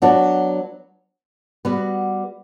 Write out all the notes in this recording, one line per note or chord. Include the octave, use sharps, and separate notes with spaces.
F#3 B3 D4 F#4
G3 B3 F#4 B4